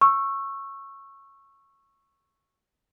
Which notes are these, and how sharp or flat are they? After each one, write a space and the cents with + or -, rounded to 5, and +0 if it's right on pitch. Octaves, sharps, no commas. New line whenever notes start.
C#6 -10 E6 +15